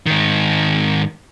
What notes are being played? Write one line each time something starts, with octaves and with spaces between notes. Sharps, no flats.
G#2 D#3